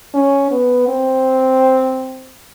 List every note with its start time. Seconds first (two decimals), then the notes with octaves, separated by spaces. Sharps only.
0.14 C#4
0.51 B3
0.88 C4